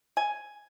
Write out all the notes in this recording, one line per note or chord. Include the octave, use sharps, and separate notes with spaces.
G#5